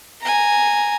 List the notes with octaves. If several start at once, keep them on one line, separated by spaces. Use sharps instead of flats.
G#5 A#5